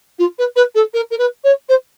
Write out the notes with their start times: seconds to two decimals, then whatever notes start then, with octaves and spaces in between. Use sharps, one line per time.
0.19 F4
0.39 B4
0.56 B4
0.75 A4
0.94 A#4
1.11 A#4
1.18 B4
1.44 C#5
1.69 C5